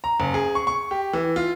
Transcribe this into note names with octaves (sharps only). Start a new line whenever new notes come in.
A#5
F#1
G#4
C#6
C#6
G4
E3
F4